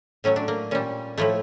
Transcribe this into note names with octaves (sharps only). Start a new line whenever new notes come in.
A2 F#3 A3 C#4
D4
A#3
A#2 G3 C#4
A2 F3 A3 E4